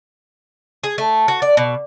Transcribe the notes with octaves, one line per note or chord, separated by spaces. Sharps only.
G#4
A3
F#4
D5
B2